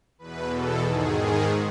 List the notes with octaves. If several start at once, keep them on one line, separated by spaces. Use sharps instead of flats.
E2 B2 B4
A4
G#2 D#3 G#4
G#4